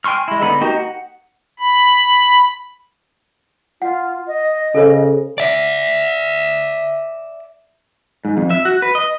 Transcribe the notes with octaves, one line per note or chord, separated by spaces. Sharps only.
G5 G#5 C6 C#6 F6
G#3 E4
D3 G#3 B3 D#4 B5
A#3 D#4 F#4 G4 A#4
F#5
B5
F4 F#5
D#5
C#3 A4 A#4 C5
D5 E5
G#2
F2
E5
F#4
B4
D#5